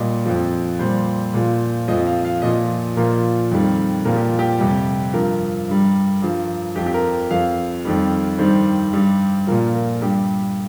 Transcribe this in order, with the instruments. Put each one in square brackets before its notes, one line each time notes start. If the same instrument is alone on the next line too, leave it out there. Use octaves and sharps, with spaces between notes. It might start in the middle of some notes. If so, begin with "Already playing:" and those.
Already playing: [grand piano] A#2 G3 D#5
F2 F3
A#2 G3 C5
A#2 F3
F2 F3 D#5
F5
F5
A#2 F3 D#5
A#2 F3 A#4
F2 D#3 G3
A#2 F3 A#4
G4
G4
F2 C3 G3
G2 F3 A#4
G2 G3
G2 F3
F2 F3 G4
G4
A#4
F2 F3 F5
F2 D#3 G3
G2 D#3 G3 C5
G2 G3
A#2 F3 A#4
A#4
G2 G3 G4